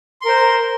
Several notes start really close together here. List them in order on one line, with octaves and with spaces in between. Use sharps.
C6 A#4 C5